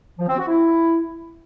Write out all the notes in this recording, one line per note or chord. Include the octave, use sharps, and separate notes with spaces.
F3
C4
F#4
E4